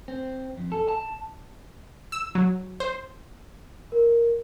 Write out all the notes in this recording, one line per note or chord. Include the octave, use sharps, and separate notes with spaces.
C4
F2
A4
A5
E6
F#3
C5
A#4